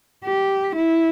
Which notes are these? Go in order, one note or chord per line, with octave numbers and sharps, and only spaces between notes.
G4
E4